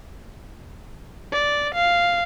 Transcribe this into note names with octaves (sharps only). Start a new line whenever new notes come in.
D5
F5